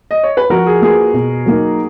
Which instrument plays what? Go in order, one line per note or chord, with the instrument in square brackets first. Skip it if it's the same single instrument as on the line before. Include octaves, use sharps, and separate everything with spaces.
[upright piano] D#5
C#5
B4
[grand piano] F3 [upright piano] F#4 A#4
[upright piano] G#4
[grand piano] A#3 F4 B4 [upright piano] G#4
[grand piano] B2
F#3 A#3 D#4 A#4